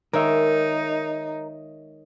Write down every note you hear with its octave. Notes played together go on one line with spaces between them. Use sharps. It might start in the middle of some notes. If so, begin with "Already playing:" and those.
D#3 G#3 D#4 A#4 C#5 E5